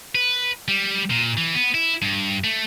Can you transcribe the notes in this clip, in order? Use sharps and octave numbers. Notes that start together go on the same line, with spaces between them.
B4
G3
A#2
E3
B3
E4
G2
A3